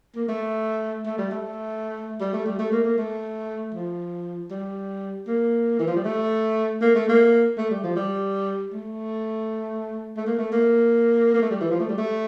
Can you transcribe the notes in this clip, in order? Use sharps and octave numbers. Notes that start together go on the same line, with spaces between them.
A#3
A3
A3
G3
A3
G3
A3
G3
A3
A#3
A#3
A3
F3
G3
A#3
E3
F3
G3
A3
A#3
A3
A#3
A3
G3
F3
G3
A3
A3
A#3
A3
A#3
A#3
A3
G3
E3
F3
A3
G3
A3